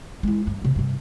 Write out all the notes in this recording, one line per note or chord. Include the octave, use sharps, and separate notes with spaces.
G#3 E4
G2
C3 B3
G2 C3